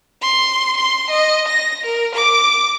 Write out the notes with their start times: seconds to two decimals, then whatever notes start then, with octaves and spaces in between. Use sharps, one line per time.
0.22 C6
0.77 C6
1.10 D#5
1.48 A#6
1.84 A#4
2.15 D6